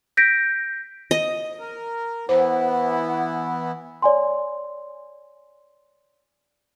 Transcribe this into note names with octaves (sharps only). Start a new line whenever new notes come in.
G6 A#6 B6 D7
D#5
A#4
E3 B3 E4 C5 F#5
C#5 D5 G#5 C6